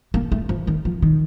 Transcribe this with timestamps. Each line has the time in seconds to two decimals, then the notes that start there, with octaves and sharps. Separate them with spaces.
0.14 A#3
0.32 A3
0.49 F3
0.67 D#3
0.85 F3
1.02 D#3